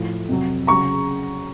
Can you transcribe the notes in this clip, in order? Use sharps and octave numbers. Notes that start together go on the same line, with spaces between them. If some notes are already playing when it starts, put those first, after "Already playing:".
Already playing: A2 F3
F2 C3 F#3
C#3 F#3 A#5 C#6